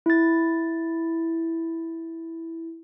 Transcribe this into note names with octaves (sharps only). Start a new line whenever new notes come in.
E4 A6